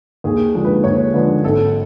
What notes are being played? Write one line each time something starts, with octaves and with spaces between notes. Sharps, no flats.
D#2 G#4
D3 F3 G#3
B4
D#2 C#5
D3 F3 G#3 B4
G#1 A4